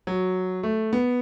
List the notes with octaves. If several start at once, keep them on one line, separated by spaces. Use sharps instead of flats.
F#3
A3
B3